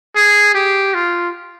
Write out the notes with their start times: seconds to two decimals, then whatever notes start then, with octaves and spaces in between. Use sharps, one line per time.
0.16 G#4
0.54 G4
0.94 F4